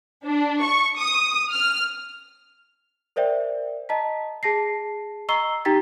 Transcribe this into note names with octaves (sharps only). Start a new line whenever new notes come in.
D4
C#6
D#6
F6
A#4 C5 D5 E5 G5
D#5 A5 A#5 B6
G#4 A5 A#6 C7
D#5 A#5 C#6 E6 C7 G7
D#4 G4 G5 A#5 A6 B6